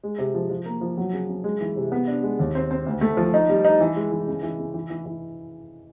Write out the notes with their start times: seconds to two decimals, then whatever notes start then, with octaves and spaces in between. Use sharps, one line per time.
0.03 G#3
0.19 C3
0.34 F3
0.50 F3
0.65 A#3
0.81 F3
0.97 F#3
1.13 C#3
1.29 C#3
1.44 G#3
1.61 E3
1.76 C3
1.92 B3
2.08 D4
2.23 G#3
2.39 D#2
2.55 C4
2.71 C4
2.86 D2
3.01 A3
3.17 F3
3.34 D#4
3.50 G3
3.65 D#4
3.81 E3
3.96 G#3
4.12 E3
4.27 C#3
4.43 E3
4.59 C#3
4.74 E3
4.90 E3
5.06 E3